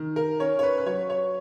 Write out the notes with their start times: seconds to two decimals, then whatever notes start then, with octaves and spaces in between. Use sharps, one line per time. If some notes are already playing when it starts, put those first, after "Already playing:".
Already playing: D#3
0.16 A#4
0.40 C#4 C#5
0.59 C#5
0.63 B4
0.78 B4
0.86 F#3 C#5
1.10 C#5